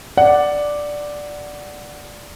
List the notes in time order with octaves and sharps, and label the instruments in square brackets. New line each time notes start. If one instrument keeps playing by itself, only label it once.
[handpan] D5 [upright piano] F#5